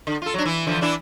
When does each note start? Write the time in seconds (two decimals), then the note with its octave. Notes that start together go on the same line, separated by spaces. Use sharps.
0.07 D3
0.22 F4 A4
0.34 F#3 D4
0.46 E3 E4
0.67 D3 E3 F3
0.81 E3 D4 E4